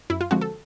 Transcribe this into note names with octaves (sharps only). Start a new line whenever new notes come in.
F#2 E4
F4
D3 F3 G#3 C4 F#4
A4